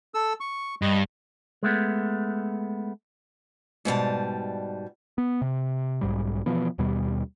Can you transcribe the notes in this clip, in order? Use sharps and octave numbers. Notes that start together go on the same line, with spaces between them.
A4 E6
C#6
G2 D#5
G#3 A3 B3
G#2 B2 G3 A5
B3
C3
B1 G#2 G3
B2 E3 F3 B3
D#2 B2 G3